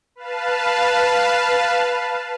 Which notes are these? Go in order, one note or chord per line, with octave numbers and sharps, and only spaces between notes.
B4 F5 A5